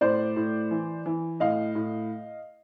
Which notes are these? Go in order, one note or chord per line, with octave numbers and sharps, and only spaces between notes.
A2 C5 D5
A2
E3
E3
A2 D#5 F5
A2